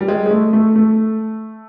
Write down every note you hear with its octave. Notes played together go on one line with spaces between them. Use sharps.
G3
G#3
G#3
A3
A3
A3